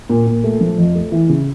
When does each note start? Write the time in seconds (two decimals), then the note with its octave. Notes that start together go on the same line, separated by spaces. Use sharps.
0.09 A#2
0.27 A#2
0.44 A3
0.61 F3
0.78 F2
0.95 A3
1.12 E3
1.29 C#3